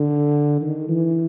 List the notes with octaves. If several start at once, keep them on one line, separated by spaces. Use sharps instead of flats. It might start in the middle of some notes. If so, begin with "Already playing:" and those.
Already playing: D3
D#3
E3